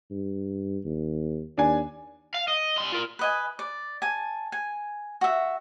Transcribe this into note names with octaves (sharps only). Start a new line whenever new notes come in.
G2
D#2
D#2 D4 G#5
F5
D#5
G3 C6
F4 A#4
B4 D#5 G#5
D5
G#5 A5
G#5
F#4 E5